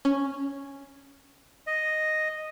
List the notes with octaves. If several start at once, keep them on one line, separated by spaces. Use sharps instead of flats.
C#4
D#5